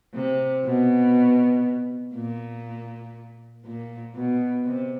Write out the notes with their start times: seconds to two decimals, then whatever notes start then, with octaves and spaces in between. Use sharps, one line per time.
0.14 C3
0.64 B2
2.14 A#2
3.64 A#2
4.14 B2
4.64 C3